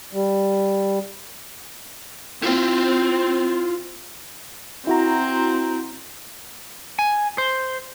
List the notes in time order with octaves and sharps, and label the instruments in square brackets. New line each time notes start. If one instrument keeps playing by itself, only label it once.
[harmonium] G3
[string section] C4 [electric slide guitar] E4 F4
[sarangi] C4 [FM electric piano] E4 F#4 A#5
[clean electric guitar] G#5
C5